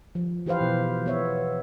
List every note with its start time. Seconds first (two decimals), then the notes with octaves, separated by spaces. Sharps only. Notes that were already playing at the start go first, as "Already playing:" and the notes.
0.15 F3
0.46 E3 G4 B4 C5 F5
0.61 B2
1.06 B3 C#5 E5